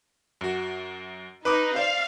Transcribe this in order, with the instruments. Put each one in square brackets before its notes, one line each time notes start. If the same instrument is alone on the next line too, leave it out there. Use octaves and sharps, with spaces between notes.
[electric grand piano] F#2 F#4
[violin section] D#4 [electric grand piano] B4 D6 D#6
[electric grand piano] C5 D5 [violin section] F5